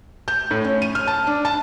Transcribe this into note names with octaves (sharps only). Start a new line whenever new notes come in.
G6
A2
C#4
D#7
F6
A5
D4
A5